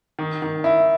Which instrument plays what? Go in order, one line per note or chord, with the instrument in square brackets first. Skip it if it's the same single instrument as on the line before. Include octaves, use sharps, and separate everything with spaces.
[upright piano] D#3
D#3
E4